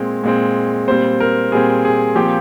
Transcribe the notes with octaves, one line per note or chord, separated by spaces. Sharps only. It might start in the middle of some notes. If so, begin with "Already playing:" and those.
Already playing: A#2 G#3 C4
A#2 G#3 C4
A#2 G3 C4 C5
A#4
A#2 G3 C4 G#4
G#4
A#2 F3 C4 G4